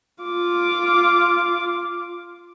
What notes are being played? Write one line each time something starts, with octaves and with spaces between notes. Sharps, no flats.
F4 D6